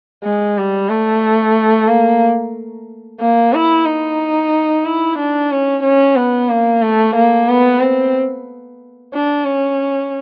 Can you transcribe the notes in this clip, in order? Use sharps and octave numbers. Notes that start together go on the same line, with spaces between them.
G#3
G3
A3
A#3
A#3
E4
D#4
E4
D4
C#4
C#4
B3
A#3
A3
A#3
B3
C4
D4
C#4